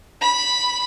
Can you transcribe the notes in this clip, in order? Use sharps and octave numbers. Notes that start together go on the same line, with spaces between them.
B5